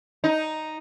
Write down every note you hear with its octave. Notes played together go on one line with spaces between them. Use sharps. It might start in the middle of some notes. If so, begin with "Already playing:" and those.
D#4